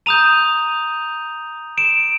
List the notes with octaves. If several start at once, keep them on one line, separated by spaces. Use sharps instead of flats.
A#5 D#6 G6 D#7 F7
D7 E7